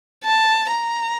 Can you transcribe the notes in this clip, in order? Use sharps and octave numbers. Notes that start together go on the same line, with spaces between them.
A5
A#5